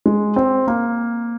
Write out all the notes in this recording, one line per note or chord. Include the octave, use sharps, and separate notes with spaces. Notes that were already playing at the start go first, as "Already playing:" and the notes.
G#3
C4
A#3